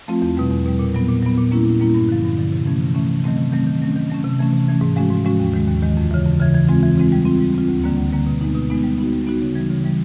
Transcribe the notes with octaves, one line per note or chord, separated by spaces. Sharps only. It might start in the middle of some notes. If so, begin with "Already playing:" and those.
F3 A3 C4 F4
E2
B2 G3
E2
B2 G3
A#2
F#3 B3
A#2
F#3 B3
A#2
G3 A#3 C#4 E4
A#2
G3 A#3 C#4 E4
G2
D3 F3
G2
D3 F3
C3
E3 A3 C#4
C3
E3 A3 C#4
C3
D#3 F#3 A3 C4
C3
D#3 F#3 A3 C4
D#3
F#3 A3 C#4
D#3
F#3 A3 C#4
C3
E3 A3 C#4
C3
E3 A3 C#4
G#2
F3 G#3 C#4 F#4
G#2
F3 G#3 C#4 F#4
D#2
D#3 G#3
D#2
D#3 G#3
F2
C#3 E3
F2
C#3 E3
E3
G#3 C4 F4
E3
G#3 C4 F4
G3
C4 F4
G3
C4 F4
D2
D3 G3 A#3
D2
D3 G3 A#3
B2
G#3 B3 D#4
B2
G#3 B3 D#4
G3
B3 D#4 F#4
G3
B3 D#4 F#4
C#3
E3 G3
C#3
E3 G3